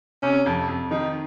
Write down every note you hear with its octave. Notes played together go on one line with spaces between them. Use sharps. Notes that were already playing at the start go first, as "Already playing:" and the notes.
C3 C#4
F2
F2
D#3 D#4